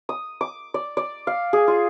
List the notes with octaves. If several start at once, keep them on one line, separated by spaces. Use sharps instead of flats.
D#6
D6
D5
D5
F5
G#4
F4